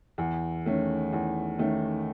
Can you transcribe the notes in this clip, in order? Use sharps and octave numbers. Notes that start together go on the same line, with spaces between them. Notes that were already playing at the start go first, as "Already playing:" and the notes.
E2
D#3 A3 C#4
E2
D#3 A3 C#4